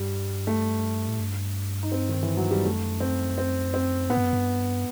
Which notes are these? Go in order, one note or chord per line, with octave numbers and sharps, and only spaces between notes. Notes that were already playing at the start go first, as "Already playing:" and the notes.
Already playing: G2 G3
A3
A2
G2
D#4
C4
D#3
E3
F#3
G3
F#2 A3
C4
C4
C4
A2 B3
G2
F#2
G2